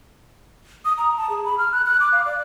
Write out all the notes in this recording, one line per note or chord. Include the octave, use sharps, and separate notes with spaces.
D#6
A#5
A5
G#4
B5
F6
F#6
F#6
D6
F5
D5